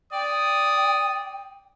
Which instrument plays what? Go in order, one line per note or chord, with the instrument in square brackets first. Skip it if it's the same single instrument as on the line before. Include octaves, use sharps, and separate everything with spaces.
[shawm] D5 [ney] G5 [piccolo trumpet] D#6